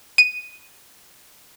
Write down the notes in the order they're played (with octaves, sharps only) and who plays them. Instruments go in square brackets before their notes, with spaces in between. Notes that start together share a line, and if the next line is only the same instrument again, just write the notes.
[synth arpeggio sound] D#7